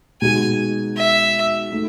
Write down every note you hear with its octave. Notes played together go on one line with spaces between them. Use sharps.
B2 G#3 D#4 F#4 G#5
E5
A3 D#4